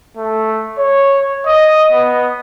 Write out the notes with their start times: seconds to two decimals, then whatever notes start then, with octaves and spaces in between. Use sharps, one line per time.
0.17 A3
0.78 C#5
1.46 D#5
1.92 B3